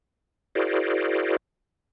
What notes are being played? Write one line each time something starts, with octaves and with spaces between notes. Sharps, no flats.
E4 F#4 G#4 A#4 C5 D5